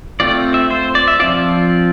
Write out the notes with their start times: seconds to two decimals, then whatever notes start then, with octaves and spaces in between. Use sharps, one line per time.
0.20 A3 C4 F4 D5
0.54 E5
0.70 C5
0.95 D5
1.08 E5
1.20 F3 C4 F4 D5